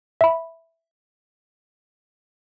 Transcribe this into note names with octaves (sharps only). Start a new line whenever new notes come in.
E5 B5